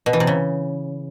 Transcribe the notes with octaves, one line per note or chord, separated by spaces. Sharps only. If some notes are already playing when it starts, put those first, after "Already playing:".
B2
E3
C3
C#3